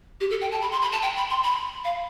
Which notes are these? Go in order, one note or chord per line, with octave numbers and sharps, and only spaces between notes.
G4
A4
G5
A5
B5
C6
B5
A5
G5
B5
C6
B5
F5